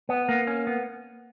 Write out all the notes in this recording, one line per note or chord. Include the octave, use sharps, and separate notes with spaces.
B3
A#3
C#4
B3